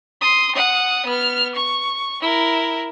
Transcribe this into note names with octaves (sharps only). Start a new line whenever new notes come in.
C6 D#6
F#5 D#6
B3 F6
C#6
E4 A#4